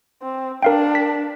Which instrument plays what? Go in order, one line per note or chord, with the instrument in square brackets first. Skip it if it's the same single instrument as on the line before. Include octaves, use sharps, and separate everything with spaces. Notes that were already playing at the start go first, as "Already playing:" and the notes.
[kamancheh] C4
[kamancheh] D4 [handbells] A#4 F5 G5
[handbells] B6